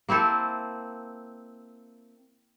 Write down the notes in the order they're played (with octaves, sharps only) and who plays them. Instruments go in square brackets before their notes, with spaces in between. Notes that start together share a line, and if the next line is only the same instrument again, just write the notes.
[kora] A#3 C4 E4 A4